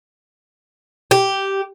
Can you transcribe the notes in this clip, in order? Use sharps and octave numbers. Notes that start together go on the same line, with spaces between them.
G4